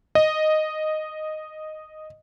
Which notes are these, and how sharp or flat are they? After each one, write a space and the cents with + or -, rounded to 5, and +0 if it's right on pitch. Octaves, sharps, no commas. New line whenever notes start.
D#5 -5